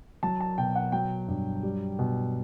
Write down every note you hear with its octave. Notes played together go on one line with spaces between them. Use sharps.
F#3 A5
A5
B2 G5
F#5
F#3 G5
G2
G3
B2